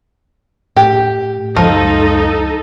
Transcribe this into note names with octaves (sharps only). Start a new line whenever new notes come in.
A2 G4
C#2 F#2 F3 G#3 D#4 A4